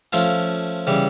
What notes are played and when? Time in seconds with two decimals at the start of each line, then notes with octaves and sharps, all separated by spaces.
0.13 F3 A3 C#4 F4
0.87 C#3 E3 G3